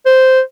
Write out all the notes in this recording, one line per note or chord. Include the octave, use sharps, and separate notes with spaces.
C5